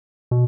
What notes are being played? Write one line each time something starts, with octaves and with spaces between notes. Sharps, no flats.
B2